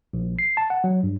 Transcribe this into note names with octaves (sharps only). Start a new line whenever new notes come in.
A#1
C7
A5
F#5
F#3
G2